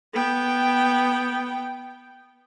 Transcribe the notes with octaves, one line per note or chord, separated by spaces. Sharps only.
B3 G5